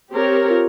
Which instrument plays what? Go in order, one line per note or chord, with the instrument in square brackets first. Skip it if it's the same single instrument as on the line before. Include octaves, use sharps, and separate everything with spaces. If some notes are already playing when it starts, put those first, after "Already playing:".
[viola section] C4 G4 A#4 C#5
[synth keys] F4